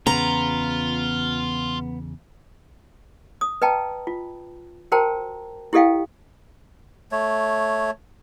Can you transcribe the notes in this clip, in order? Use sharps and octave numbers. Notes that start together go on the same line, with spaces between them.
E2 C#3 B3 F4 A#5
D#6
B4 D#5 G5 A5 A#5
F4
F#4 A#4 C5 G5 A5 A#5
E4 G4 A4 D#5 F5 G5
A3 C#5